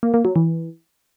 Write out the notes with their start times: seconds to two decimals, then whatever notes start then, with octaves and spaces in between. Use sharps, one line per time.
0.03 A#3
0.14 A#3
0.25 F#3
0.36 E3